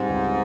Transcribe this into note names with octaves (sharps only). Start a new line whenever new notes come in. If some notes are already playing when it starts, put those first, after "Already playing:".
Already playing: G#2 G3 C4
C#2